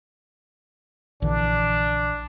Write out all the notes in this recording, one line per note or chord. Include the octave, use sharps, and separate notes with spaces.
A#1 D3 E3 D4